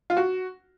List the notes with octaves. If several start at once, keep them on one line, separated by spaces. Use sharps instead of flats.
F4
F#4